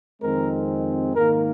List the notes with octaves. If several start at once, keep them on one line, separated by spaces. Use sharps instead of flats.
F2 D#3 G#3 C4 A#4
G#2 D#3 A#3 A#4